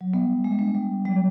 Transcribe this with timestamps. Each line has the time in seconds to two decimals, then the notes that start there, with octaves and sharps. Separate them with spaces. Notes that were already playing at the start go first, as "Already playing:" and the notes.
0.01 F#3
0.13 G3 B3
0.44 G#3
0.51 G3
0.59 G#3 D4
0.75 G3
1.05 F#3 G3